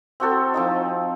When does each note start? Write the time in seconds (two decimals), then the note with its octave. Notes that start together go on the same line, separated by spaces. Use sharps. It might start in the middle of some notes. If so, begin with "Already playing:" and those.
0.20 C4 F#4 A4
0.54 F3 C4 D#4